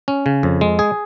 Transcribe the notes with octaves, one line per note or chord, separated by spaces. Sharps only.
C#4
C#3
F2
G#3
G#4